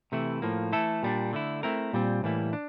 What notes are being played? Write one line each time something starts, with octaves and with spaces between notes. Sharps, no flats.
C3 E3 A3 E4
A2 F3 A#3
E3 A3 E4 A4
A#2 G3 D4
D3 A3 E4
A3 C4 E4 A#4
A#2 G3 C4
A2 E3 G3 A#3 E4
D4